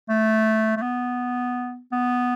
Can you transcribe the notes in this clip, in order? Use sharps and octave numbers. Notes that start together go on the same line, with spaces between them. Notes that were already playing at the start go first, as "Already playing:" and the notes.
A3
A3
B3
B3